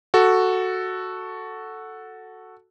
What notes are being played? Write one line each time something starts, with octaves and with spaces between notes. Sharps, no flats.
F#4 A4